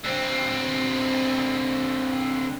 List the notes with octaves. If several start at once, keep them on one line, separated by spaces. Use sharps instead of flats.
D3 C4